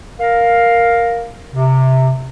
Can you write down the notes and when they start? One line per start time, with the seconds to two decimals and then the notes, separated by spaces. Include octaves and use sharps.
0.20 A#4 F5
1.54 C3